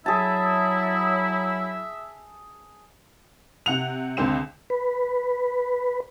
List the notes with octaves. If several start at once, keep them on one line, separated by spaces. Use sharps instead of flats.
F#3 E4 G#4 E5 A5
C3 F#5 F7
C#2 D3 C4 E7
B4